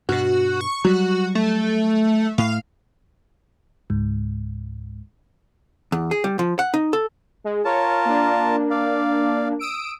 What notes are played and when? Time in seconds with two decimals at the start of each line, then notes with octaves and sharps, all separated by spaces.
0.09 G2 B2 F#4
0.61 C#6
0.84 F#3 G3 F#4
1.35 A3
2.38 A2 F5
3.90 C#2 G#2
5.92 E2
6.11 G#4
6.24 G3
6.39 F3
6.59 F#5
6.74 D#4
6.93 A4
7.44 G#3
7.65 F4 A#4 C#5 A5
8.05 A#3 D4
8.70 D5 F5
9.59 D#6 E6 D7